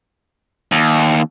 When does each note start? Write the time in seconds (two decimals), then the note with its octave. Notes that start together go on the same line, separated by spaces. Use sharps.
0.72 D#2